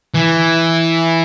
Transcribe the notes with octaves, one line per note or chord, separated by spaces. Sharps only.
E3